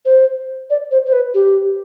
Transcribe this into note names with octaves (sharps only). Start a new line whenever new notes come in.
C5
D5
C5
C5
B4
G4